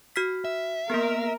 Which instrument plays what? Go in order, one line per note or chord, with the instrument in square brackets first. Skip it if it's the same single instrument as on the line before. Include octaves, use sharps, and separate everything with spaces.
[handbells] F#4 F6 B6
[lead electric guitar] E5
[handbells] A#3 B3 [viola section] A#4